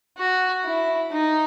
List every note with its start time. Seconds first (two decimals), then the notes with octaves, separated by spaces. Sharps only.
0.18 F#4
0.65 E4
1.12 D#4